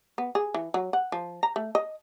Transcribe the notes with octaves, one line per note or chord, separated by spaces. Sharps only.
B3
G#4
E3
F#3
F#5
F3
A#5
A3
D#5